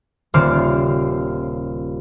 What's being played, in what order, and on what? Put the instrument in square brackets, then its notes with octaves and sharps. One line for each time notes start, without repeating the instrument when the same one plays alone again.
[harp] D#1 C#3 B3 C5 D6 F6